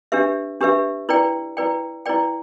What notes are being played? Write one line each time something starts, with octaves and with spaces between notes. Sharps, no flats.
D4 G4 B4 E5
D4 G4 B4 E5
E4 B4 D5 G5
E4 B4 D5 G5
E4 B4 D5 G5